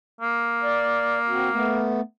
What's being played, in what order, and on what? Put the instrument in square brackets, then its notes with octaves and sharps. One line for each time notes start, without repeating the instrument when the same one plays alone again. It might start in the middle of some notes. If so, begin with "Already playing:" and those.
[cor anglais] A#3
[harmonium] D5
C4 F#4
A3 B3